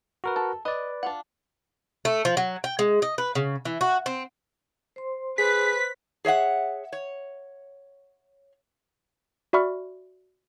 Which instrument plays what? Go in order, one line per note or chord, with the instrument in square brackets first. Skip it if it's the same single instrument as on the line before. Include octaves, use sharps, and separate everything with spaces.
[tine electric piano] F#4 A#4 B4
[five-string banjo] A4
[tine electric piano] B4 D5 [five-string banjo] D#5
[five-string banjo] D4 F4 F#5
[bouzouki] A3
F3
F#3
G5
G#3
D#5
B4
C#3
E3
F#4
C4
[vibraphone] C5 C6
[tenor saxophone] G#4 [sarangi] B4 [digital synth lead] B6
[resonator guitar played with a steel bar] G#4 C#5 E5 F#5
C#5
[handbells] F#4 D5 E5 B5 C#6 F6